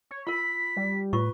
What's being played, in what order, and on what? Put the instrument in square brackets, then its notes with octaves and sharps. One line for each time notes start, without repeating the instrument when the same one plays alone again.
[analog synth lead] C#5
[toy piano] F4 A#4 [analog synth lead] B5 [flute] B6
[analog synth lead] G3
[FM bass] A2 [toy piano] F4 C#6 [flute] B4